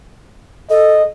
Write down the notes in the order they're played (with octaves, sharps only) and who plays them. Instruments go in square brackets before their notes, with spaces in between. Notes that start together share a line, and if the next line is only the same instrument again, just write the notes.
[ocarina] A4 [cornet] D#5